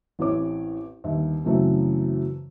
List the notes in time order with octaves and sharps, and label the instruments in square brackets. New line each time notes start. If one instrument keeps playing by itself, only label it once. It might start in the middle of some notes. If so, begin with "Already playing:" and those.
[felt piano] A1 E3 C4 C#5 D6
G1 D#2 E5
F#2 C#3 E3 F#3 A3 C4